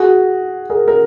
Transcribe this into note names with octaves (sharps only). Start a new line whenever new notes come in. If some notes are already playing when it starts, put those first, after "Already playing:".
Already playing: F#4 G#4
G#4 A#4
A#4